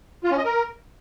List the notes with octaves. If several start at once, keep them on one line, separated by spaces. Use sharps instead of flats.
F4
C#4
D#5
A#4